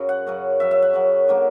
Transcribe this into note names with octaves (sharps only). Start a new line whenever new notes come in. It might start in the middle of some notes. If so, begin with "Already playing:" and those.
Already playing: F#2 C#3 F#3
F#5
F#2 C#3 F#3
F#2 C#3 F#3 E5
E5
F#5
F#2 C#3 F#3
D3 F#3 A#3